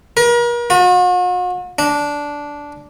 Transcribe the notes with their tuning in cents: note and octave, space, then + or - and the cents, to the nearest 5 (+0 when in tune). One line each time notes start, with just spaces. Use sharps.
A#4 +40
F#4 -45
D4 -10